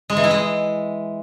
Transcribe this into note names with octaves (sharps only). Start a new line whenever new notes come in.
G#3
E3
E4
G#3